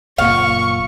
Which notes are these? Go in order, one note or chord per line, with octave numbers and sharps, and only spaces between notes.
F#1 A#2 F5 C#6